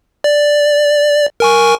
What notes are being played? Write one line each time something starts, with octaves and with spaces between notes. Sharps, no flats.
D5
A#4 G#5 C#6